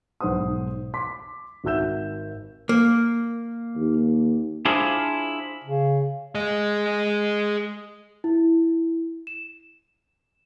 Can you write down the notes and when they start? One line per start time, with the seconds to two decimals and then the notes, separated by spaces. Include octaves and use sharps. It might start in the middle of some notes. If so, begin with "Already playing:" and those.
0.21 B1 G#2 C5 F#5 D#6
0.94 C6 D6 B6
1.64 G#1 F#4 E5 E6 G6 E7
2.69 A#3
3.76 D#2
4.65 D4 E4 F4 G#4 C5
5.64 C#3
6.35 G#4 D#5
8.24 E4
9.27 E7